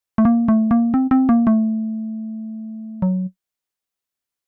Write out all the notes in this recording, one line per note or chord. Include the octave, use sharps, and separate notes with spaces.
A3
A#3
A3
A#3
C4
C4
A#3
A3
F#3